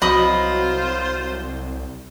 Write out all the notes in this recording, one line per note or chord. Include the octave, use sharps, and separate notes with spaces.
C2 F#3 F4 C5 D#5 B5 D#6